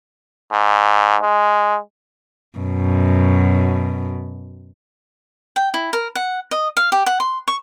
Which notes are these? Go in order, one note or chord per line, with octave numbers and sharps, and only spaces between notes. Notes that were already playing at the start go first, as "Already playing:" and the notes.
G#2
G#3
F#2 B2
G5
E4
A#4
F#5
D#5
F5
G4
F#5
C6
C#6